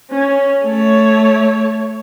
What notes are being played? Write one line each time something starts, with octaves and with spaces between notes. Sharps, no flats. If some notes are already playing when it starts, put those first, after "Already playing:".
C#4
A3 C#5